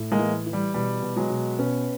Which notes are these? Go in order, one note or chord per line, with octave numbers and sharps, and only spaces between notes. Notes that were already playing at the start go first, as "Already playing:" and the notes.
Already playing: A2
G#3 A#3
E3
E3
G3
B2 G3
B2
F#3 G#3
B2
B2 B3 C#4